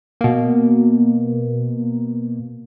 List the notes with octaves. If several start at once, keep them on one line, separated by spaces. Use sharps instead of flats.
B2 A#3